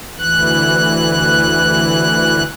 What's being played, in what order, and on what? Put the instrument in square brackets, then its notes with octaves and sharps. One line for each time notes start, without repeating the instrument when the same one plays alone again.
[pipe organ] D2 E3 F#6